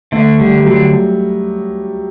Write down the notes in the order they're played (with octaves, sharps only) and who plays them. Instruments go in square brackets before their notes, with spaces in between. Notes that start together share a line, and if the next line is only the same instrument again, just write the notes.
[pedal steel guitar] D3 [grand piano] A3
[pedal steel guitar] D3 [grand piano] G3
[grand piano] G3
[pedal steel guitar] D3 [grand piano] F#3